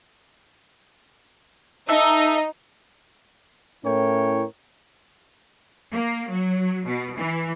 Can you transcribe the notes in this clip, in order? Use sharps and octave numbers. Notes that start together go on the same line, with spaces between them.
D#4 A4 E5
A2 C#4 E4 A#4 C#5 G5
A#3
F#3
B2
E3